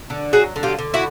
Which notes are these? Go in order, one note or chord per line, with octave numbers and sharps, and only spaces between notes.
D3
F#3 F#4 G#4
D3
F4 G4
D3
E4 F#4